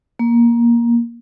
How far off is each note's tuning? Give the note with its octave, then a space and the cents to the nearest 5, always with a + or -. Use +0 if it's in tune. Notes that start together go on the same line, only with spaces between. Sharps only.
A#3 +15